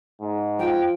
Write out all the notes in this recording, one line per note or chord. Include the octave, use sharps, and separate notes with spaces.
G#2
F3 G5